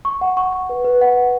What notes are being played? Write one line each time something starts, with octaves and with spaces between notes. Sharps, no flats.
C#6
F#5
C#6
C#6
B4
B4
F#5
B4